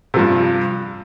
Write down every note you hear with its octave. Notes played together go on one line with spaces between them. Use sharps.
G2 C3 F3